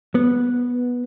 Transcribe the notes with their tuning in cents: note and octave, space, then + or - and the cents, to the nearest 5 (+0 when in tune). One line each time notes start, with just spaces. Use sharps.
B3 -10